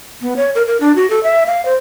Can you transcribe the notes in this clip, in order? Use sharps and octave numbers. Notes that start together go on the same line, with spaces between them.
B3
C#5
A#4
A#4
D4
F#4
A4
E5
F5
C5